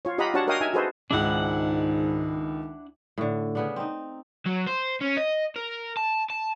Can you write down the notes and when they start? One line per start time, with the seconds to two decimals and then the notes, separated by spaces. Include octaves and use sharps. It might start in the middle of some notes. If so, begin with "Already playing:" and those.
0.05 F4 C#5
0.18 F4 G4 D#5 F#5 A#5 B5
0.34 D4 F#4 G4 C#5 F#5 A5
0.47 A#4 C#5 D#5 F5 G5 D#6
0.61 D#4 E5 G#5
0.74 F#4 G#4 A4 B4 C5 D#5
1.11 C#2 G#2 D#3 D4 E4 G#4 F#5
3.18 A2 D3
3.55 C#3 B3 D4
3.76 C4 D#4
4.46 F#3
4.67 C5
5.01 C#4
5.18 D#5
5.56 A#4
5.97 A5
6.30 A5